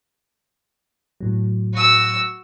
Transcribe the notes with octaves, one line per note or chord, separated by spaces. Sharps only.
A2 F#3
F#4 E6